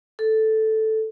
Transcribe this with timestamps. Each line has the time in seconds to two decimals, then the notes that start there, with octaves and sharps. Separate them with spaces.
0.19 A4